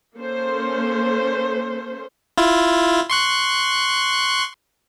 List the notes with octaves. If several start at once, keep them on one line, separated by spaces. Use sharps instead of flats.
A#3 C#4 A4 C5
E4 F4
C6 C#6 F#6